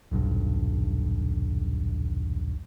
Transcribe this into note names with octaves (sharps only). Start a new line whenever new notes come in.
D#1 B1 G2